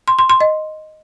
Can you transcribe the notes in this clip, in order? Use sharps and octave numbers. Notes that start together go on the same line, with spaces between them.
C6
C6
C6
D#5